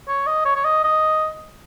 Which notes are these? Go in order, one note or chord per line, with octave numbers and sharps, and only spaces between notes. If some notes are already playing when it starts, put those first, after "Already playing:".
C#5
D#5
C#5
C#5
D#5
D#5